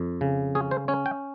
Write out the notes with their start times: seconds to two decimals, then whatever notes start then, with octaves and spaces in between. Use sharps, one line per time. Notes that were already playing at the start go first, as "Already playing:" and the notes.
Already playing: F2
0.21 C#3
0.55 C#4 G#4
0.71 C5
0.88 C#4 C#5
1.06 G5